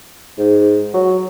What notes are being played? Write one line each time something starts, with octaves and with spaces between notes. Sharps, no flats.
G#2
F#3